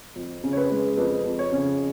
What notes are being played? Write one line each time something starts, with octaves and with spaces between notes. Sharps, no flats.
F2
C#3
C#5
B4
G#3
F2 B4
F2
C#5
C#3